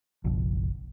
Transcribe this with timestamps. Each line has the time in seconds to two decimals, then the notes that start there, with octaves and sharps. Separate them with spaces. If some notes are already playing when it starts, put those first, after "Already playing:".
0.24 F#1 B1 F3